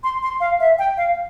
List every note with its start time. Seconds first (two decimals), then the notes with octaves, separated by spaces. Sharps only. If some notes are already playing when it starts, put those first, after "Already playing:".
0.04 C6
0.23 C6
0.40 F5
0.60 E5
0.79 G5
0.97 F5